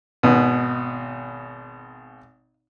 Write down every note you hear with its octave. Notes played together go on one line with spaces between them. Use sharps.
G#1 B2